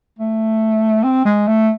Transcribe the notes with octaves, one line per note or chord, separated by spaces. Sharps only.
A3
C4
G#3
A3